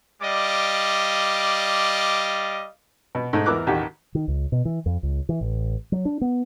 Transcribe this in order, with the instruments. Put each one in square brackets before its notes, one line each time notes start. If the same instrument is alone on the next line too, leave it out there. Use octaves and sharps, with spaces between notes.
[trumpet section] G3 D5 D#5 F5 D6
[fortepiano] B2
G#2 A3
E2 E3 A#4 D6 F#6
A1 D#2 F#4 G4
[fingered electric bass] D#3
C#2
B2
E3
F2
C#2
E3
A1
F#3
D4
B3